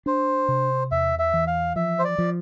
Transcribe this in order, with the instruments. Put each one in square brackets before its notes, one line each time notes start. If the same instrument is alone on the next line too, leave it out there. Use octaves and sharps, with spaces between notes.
[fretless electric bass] D4 [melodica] C5
[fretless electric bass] C3
[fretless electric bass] E2 [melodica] E5
[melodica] E5
[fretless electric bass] E3
[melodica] F5
[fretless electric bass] F3 [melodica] E5
[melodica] C5
D5
[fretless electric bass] F3